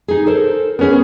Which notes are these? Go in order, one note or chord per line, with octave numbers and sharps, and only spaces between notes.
D#4 G#4
A4 A#4 C5
B3 C#4 G#4 A#4